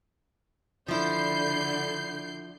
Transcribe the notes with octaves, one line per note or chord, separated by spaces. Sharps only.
D3 F3 E4 G6 C7